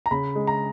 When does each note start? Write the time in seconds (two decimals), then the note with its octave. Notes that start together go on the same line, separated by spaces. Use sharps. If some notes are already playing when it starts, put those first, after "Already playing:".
0.06 A#5
0.11 C#3 B5
0.35 G#3
0.47 A#5